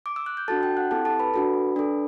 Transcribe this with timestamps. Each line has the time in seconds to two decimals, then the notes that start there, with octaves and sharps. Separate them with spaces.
0.06 D6
0.16 E6
0.26 F#6
0.37 G6
0.48 D4 F#4 A4 A5 A6
0.62 G5 G6
0.77 F#5 F#6
0.91 C4 E4 G4 A4 A5
1.05 A4 A5
1.19 B4 B5
1.34 D4 F#4 A4
1.76 D4 A4